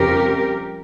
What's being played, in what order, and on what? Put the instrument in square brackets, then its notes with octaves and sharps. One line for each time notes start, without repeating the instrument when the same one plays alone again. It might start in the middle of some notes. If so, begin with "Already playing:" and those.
Already playing: [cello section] F2 C#3 G3 G4 A#4